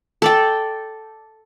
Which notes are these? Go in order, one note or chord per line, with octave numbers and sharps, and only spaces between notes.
A4 D5 G5